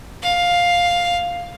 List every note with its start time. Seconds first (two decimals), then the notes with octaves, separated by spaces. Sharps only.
0.22 F5